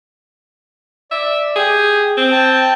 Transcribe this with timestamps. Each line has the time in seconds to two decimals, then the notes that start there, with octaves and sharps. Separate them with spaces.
1.11 D5 E5
1.56 G4 G#4
2.17 C4
2.32 G5 A5